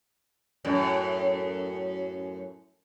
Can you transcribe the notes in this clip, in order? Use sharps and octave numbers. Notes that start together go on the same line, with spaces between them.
F#2 A2